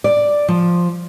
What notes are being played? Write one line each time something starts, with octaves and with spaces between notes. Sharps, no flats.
D5
F3